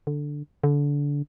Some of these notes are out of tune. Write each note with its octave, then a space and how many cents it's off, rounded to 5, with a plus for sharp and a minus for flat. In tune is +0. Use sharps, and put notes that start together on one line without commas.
D3 +0
D3 -25